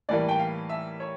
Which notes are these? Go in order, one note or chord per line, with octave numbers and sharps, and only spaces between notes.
A2 E3 G3 A#3 D5
G5
F5
E5
C#5